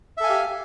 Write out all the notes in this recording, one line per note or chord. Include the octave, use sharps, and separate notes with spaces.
G4 A4 E5 F5 G#5